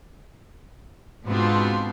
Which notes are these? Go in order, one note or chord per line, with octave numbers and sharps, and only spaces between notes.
G#2 B2 B3 C4 D4 F4